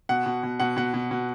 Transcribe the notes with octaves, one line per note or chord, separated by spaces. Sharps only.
B2 F#5
B2
B2
B2 F#5
B2 F#5
B2
B2